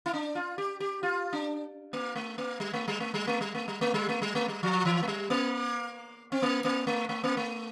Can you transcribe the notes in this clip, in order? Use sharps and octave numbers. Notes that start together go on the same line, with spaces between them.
E4
D4
F4
G4
G4
F4
D4
A#3
A3
A#3
G3
A3
G3
A3
G3
A3
G3
A3
G3
A3
G3
A3
G3
A3
G3
F3
E3
A3
G3
A#3
C4
A#3
A#3
A3
A3
A#3
A3